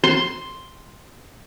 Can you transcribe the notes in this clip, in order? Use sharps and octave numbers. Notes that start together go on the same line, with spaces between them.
C6